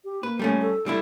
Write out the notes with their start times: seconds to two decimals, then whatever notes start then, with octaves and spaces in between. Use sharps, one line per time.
0.04 G4
0.23 A#3 B4
0.39 G3 A3 C#4
0.61 A4
0.86 G3 D4 E4